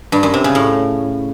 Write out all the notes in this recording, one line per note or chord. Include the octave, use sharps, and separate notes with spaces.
G2
F#2
C3
C#3
A2